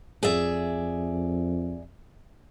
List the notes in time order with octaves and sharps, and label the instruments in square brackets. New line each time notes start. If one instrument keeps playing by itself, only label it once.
[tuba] F2 [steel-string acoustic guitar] G#4 D5 E5